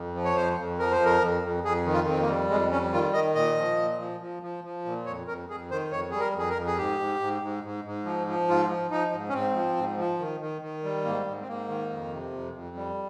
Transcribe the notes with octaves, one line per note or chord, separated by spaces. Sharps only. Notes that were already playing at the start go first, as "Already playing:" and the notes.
Already playing: F2
F3
C#5
F2 C5
F2
F3 A#4
C5
F2
A#4
F2
F2
F2 G#4
D#3
F4
F2 C4
A#3
G3
F2 G#3
G3 C#4
D#3 F4
D#3 D#5
A#2 D#5
F3
A#2
F3
F3
F3
F3
A#2
F2 C#5
F2 A#4
F2 G#4
D#3 C5
F2 C#5
G3 G#4
A#4
F2 G#4
A#4
F2
G#4
G#2 G4
G#2
G#2
G#2
G#2
G#2
F3
F3
G#2 F4
F3
F3 D#4
G#2
C#4
G#2 C4
F3
G#2
F3
D#3
D#3
D#3
G3
G#2 A#3
G#2
C4
G#2 A#3
D#3
F2
C3
F2
F2
G3